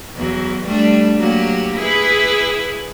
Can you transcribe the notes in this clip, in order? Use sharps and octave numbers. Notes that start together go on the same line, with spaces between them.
E2 F#3
G3 A3 D4
F#3 A#3 G4
E4 G#4 B4